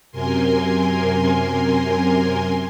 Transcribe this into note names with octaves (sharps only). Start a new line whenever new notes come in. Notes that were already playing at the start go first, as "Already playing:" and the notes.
F#2 C3 A#4 G#5 C6